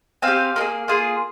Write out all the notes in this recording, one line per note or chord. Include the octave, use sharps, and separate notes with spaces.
C4 G4 F5 G#5
A#3 D#4 G#4
A#3 F4 G#4